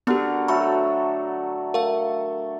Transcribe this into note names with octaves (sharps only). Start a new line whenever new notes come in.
D3 B3 F#4 G4 A#4
F#3 A3 F#4 B5
A3 A#4 F5